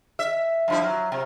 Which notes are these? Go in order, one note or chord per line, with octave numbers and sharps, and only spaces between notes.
E5
G2 F3 E4
F#3
C3